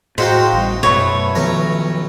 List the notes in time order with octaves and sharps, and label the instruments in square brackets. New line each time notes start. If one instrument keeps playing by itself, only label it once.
[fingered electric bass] A2 [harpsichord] G#3 F#4 A#5 [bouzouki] D#4 F5 G5 [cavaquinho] C5
[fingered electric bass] A1 G3
[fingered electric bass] F#2 B2 [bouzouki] A3 B3 [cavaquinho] C#5
[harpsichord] B1 C#4 A#5 [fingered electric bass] D#3 F3